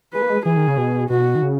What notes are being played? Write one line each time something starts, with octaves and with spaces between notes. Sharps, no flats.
G#3 B4
A#3
G#3
E3 G#4
D#3
C#3
B2
B2 F#4
D#3
C#3